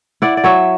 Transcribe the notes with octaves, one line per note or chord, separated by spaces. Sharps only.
E4 D5 F#5
D5
F#3 C#5 E5